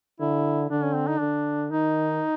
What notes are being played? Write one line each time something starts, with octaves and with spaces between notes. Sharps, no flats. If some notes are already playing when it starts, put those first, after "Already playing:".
D3 E4
D3 D4
C#4
C4
D#4
D3 D4
D#3 D#4